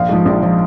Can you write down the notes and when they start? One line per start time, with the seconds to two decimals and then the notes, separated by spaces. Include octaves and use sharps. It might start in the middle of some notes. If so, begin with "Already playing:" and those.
Already playing: A#1 F5
0.09 G#2 F3
0.25 A#1
0.42 F3